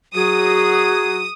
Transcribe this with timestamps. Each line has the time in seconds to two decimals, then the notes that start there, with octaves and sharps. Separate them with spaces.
0.15 F#3 F#4 G#4 D#6